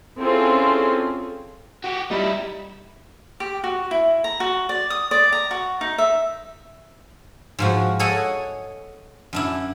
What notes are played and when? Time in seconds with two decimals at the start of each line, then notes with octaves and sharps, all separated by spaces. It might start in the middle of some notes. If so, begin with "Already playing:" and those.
0.20 C4 C#4 E4 F4 G#4 A4
1.84 F#4 G4
2.11 G3 D#4 E4
3.40 G4
3.64 F#4
3.91 E4
4.24 A#5
4.40 F#4
4.69 D5
4.90 D#6
5.11 D5
5.32 A#5
5.51 F#4
5.81 D#4
5.98 E5
7.59 G#2 F3 F#4
7.99 G#4 A4 C#5 D#5 F#5 G#5
9.33 F#2 D4 E4